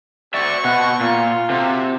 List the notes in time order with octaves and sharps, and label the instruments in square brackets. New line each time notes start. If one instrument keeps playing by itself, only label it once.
[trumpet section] C4 F#4 C#6 [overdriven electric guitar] D5 E5
[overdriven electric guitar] B2 [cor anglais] F#5
[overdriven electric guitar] A#2 [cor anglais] F4
[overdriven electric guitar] C3 [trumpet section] F#4 A4